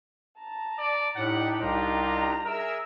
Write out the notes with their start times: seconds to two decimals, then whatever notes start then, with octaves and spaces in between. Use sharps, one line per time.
0.38 A5 A#5
0.79 D5
1.16 A2 D4 D#4 G4 F#5
1.62 C2 F4 A#5
2.45 G#4 A#4 E5 E6